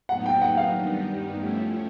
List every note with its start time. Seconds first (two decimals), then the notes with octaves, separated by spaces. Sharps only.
0.09 A2 F#3 B3 D#4 F#5
0.26 G5
0.42 F#5
0.57 F5
0.73 G2 D#3 G3 B3 D#4
1.37 F3 A3 C#4 E4